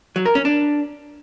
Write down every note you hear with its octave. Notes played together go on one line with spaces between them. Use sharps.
F#3
A#4
C#4
D4